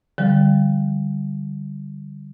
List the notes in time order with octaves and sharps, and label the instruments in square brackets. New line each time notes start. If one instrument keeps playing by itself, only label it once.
[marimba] D3 F3 G3